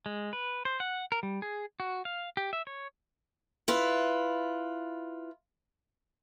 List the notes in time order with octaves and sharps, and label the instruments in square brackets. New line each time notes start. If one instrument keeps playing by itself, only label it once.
[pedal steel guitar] G#3
B4
C5
F#5
A#4
G3
G#4
F#4
F5
G4
E5
C#5
[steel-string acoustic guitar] E4 F4 B4